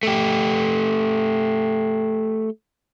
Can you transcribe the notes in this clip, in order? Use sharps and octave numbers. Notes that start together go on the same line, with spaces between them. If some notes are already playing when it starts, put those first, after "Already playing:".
A3 G4